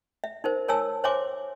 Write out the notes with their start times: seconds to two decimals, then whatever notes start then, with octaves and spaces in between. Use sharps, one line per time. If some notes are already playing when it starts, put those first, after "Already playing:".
0.24 E5
0.44 D#4 A#4 C5
0.68 A#4 C#5 G#5 A5 E6
1.04 C5 C#5 E5 G#5 C6 D6